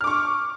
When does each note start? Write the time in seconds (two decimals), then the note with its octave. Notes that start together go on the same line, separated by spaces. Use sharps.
0.01 F6
0.04 D6
0.07 C#6